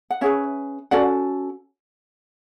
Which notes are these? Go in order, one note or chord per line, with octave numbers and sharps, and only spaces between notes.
F#5
C#4 G#4 B4 C#5 E5
C#4 F#4 A4 D5 F#5